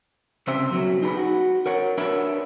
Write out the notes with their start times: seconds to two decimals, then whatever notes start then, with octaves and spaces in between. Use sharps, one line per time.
0.47 C2 C#3 C4 C5 E5
0.70 F#2 B2 F#3
1.02 D#4 G#4 B4
1.17 F#4
1.66 A#4 C#5 F#5
1.98 D4 A#4 B4 C#5 E5